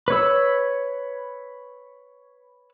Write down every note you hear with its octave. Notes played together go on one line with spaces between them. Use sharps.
B4 C#5 E6